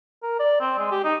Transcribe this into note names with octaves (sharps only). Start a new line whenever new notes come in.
A#4
D5
C4
G#3
G4
D#4